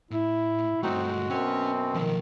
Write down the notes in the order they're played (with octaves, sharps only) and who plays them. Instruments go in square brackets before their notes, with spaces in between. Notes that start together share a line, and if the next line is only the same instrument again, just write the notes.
[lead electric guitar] A2 [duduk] E4
[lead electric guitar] G2 A3 [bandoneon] C4 D#4 [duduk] F#4
[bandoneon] G#3
[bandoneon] F#2 B2 C4 [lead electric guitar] C#4
[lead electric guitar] B1 F3 [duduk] D#3